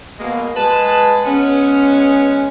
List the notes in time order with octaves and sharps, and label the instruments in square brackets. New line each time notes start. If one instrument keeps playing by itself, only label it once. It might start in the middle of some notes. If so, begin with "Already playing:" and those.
[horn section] B2 G#3 A#3
G#3 B4 A5
G#3 B3 C#4